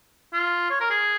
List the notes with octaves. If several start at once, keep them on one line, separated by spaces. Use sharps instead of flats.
F4
C#5
A#4
G#4